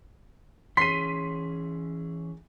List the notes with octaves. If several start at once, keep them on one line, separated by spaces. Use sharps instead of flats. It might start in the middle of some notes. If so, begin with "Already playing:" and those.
E3 C#4 G#4 C6 B6 D#7